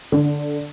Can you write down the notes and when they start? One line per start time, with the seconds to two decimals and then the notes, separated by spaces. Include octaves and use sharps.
0.12 D3